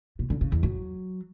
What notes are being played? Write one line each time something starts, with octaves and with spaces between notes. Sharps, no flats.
B2
D3
C#3
E2
F#3